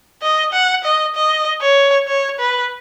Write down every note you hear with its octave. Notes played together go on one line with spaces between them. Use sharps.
D#5
F#5
D#5
D#5
C#5
C#5
B4